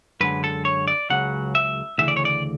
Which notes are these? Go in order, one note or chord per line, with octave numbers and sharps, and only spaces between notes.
F#2 D3 G#3 B4
A4
C#5
D5
C#2 C#3 F#3 F#5
E5
D2 C#3 E3 E5
D5
C#5
D5